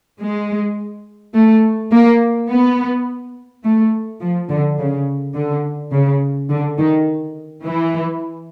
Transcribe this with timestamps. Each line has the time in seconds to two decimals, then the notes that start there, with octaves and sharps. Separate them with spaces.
0.21 G#3
1.35 A3
1.92 A#3
2.49 B3
3.64 A3
4.21 F3
4.49 D3
4.78 C#3
5.35 D3
5.92 C#3
6.50 D3
6.78 D#3
7.64 E3